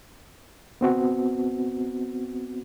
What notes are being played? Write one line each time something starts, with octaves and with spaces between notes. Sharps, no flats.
B3 C4 F#4